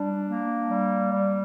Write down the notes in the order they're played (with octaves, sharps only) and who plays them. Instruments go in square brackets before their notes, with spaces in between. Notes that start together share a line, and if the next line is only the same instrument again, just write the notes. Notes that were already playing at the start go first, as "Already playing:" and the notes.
Already playing: [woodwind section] G3 D4
A#3
G3
G3